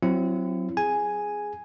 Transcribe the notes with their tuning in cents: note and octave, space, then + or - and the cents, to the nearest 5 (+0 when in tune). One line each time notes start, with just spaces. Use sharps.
F#3 +0 C4 +0 E4 +40
G#4 +0 G#5 +0